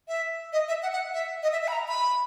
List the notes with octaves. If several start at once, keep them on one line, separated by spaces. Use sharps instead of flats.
E5
D#5
E5
F#5
F#5
E5
D#5
E5
E5
B5
A#5
B5